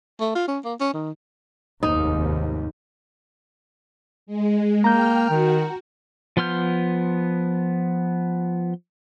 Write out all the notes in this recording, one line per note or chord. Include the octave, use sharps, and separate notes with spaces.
A3
F4
C#4
A#3
C#4
D#3
F1 D#2 G#2 D#4
G#3
A#3 G5 A#5 F6 G6
D#3 F#4
F3 B3 C6 F6 G6